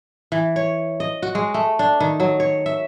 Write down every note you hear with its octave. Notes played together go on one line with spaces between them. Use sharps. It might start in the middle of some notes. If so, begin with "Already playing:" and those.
E3
C#5
D#5
F#4
G#3
A3
D4
D#3
F#3
C#5
E5